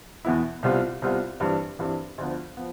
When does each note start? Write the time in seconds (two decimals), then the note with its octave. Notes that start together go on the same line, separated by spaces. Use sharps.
0.25 E2 B2 B3 E4
0.63 C2 C3 G3 B3 F4
1.02 C2 C3 G3 B3 F4
1.40 G2 E3 G3 C4
1.79 G2 E3 G3 C4
2.18 D2 D3 F3 B3
2.57 F3 B3